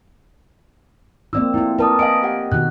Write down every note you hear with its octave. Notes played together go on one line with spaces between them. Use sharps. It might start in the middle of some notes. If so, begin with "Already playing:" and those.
A#3 C4 F4 D5 E6
A3 E4 F4
A#4 B4 D5 A5 D#6
D#5 F5 G#5 D7
G4 F#5
B2 D#3 F#4 F#6